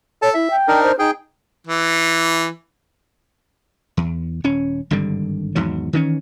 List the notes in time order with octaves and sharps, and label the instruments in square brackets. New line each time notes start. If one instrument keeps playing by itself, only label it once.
[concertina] A4 A5 [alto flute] C#5
[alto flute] E4 [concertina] E5
[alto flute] G5
[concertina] D4 D#4 A#4
[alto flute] C5
[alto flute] D#4 [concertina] G#4 G5
[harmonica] E3
[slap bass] E2
D#1 C#4
G#1 G2 D3 G3
G#1 E2 G#2 F#3
D#3 E3 A#3 C#4